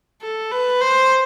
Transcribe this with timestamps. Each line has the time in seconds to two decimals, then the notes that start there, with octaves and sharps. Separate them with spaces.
0.22 A4
0.51 B4
0.81 C5